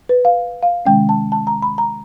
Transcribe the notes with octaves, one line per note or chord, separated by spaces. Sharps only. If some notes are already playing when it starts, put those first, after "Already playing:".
B4
F5
F5
C3 D#3 G#3 C#4 G5
A5
A5
A#5
B5
A#5